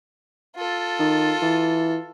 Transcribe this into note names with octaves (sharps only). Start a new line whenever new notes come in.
F4 A4
D#3
E3